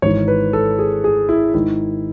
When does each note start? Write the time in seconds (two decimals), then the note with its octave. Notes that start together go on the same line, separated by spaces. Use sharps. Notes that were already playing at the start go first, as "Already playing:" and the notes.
0.02 G#1 G#2 E3 C#5
0.28 B4
0.53 A4
0.79 G#4
1.04 G#4
1.29 E4
1.54 G#1 G#2 D#3 E4